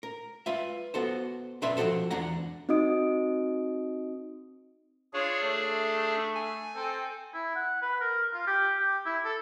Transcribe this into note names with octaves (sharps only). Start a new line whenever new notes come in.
A#4
F4 B4 E5
B3 F#4 A4 C5
B1 F#2 D4 B4 E5 C6
F3 C4 D#4 F#4 A4 C5
E2 D4 F#5 A#5
C4 D#4 F#4 D#5 D#6 D7
D4 F4 G#4 C#5
A3
G#5
C4 A4
E4
F#5
B4
A#4
F4
G4
G4
E4
A4